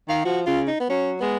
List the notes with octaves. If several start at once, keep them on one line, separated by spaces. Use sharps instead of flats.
D#3 F5
F3 F#4
C#3 F4
D#4
B3
F#3 C#4
G#3 B3